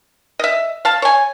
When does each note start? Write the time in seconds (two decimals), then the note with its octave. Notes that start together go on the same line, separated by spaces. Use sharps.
0.39 D#5 E5
0.85 F5 A5
1.02 C#5 G#5